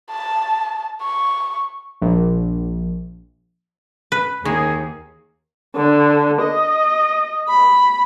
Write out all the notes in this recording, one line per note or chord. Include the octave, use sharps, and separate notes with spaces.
A5
C#6
A#1
B4
D#2 D#3 A#3 G#4
D3
D#5
B5